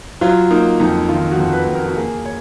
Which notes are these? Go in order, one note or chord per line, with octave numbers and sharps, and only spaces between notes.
F#3 F4
A#3 D#4
F2 D#4
D#3 F4
F#4
F2
B4
F2
A#4
F#4
A#3 G#4
C#5